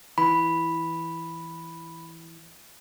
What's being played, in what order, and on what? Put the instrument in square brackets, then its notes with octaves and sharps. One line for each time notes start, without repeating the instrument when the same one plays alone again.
[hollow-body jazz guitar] E3 [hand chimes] B5